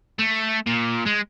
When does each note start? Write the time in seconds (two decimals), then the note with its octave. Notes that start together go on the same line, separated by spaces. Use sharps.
0.19 A3
0.67 A#2
1.06 G#3